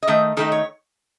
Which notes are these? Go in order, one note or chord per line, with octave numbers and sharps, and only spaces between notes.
D#5
D#3 A3 D#4 E5
D#3 A3 D#4 A4
C#5